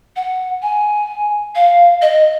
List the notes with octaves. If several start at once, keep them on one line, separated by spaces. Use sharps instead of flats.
F#5
G#5
F5
D#5